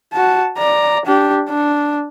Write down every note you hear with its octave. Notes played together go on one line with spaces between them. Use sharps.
F#4 A5
D5 A#5
D4 G4
D4